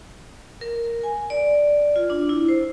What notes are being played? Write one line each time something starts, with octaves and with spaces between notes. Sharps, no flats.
A#4
G#5
D5
F4
D4
E4
C5